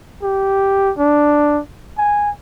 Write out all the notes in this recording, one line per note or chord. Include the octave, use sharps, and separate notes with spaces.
G4
D4
G#5